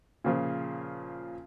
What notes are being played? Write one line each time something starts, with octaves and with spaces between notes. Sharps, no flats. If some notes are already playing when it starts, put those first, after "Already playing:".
A#2 C#3 F3